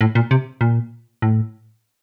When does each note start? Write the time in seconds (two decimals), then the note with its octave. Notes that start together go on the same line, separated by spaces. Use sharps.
0.01 A2
0.15 A#2
0.31 C3
0.61 A#2
1.22 A2